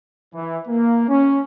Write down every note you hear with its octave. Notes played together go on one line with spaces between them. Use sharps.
E3
A#3
C#4